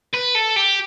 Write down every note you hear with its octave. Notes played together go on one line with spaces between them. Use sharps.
B4
A4
G4